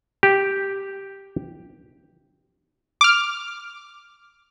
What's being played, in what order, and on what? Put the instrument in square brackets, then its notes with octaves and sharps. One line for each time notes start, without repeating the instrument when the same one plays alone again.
[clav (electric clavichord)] G4
[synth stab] D6 F6